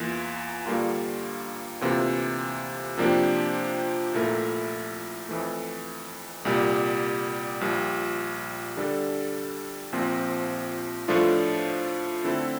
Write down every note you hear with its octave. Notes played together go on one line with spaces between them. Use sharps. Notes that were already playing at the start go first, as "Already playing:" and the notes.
Already playing: E2 E3 A#3 F4
G2 D3 G3 A#3 F4
D2 C3 E3 A#3 F4
C3 F3 A#3 D4 G4
A#1 A#2 A3 E4 A#4
F2 E3 A3
C2 A#2 G3
A#1 A#2 G3
D3 G3 D4 A4
A#1 A#2 F3 C4
A2 F3 A3 D4 F4
D3 A3 C4 E4 A4